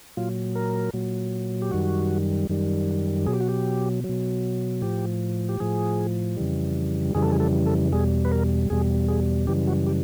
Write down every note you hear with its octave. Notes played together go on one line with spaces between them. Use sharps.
A#2 F#3 F4
A#4
A#2 F#3
G4
F#2 D#3 G3 F#4
F#2 D#3 G3
B2 F#3 G#4
G4
F#4
G4
F#3
B2
A2 F3 G4
G4
A2 F3 G#4
F2 C#3 E3 G3
F2 C#3 E3 G3 G#4
A4
G#4
A4
A4
E2 B2 G3 G#4
B4
A#4
E2 B2 G3 G#4
G#4
F#2 C#3 E3 G3 G4
F#4
G4